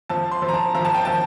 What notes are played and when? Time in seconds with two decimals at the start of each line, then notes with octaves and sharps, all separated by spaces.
0.09 F3 A5
0.31 C6
0.42 F3
0.48 A#5
0.54 A5
0.74 F3 A#5
0.85 A5
0.95 G5
1.05 F3 A5